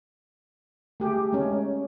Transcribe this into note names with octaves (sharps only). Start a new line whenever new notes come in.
A3 G4 G#4
G#3 C#4